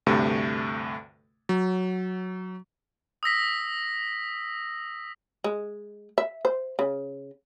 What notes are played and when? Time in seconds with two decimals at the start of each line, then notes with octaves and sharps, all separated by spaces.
0.06 D2 G2 C3 A3
1.49 F#3
3.23 D#6 E6 A#6 B6
5.44 G#3
6.18 E5
6.45 C5
6.79 C#3